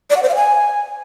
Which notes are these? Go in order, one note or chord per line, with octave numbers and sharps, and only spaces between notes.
D5
F#5
C5
F5
G#5